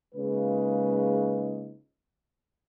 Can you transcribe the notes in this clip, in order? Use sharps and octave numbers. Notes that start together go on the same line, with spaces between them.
C#3 G#3 A#3 D#4 F4 B4